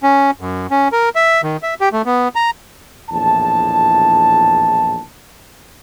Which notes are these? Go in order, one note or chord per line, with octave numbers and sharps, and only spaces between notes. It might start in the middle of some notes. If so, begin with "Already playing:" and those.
C#4
F#2
C#4
A#4
E5
D#3
E5
G4
A3
B3
A#5
A#1 E2 A2 A5